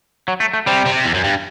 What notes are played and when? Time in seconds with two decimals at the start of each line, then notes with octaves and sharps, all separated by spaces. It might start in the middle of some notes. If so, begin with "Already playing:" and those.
0.28 F#3
0.40 A3
0.54 A3
0.66 C3 G3
0.86 C3
1.04 E2
1.14 F#2
1.24 G2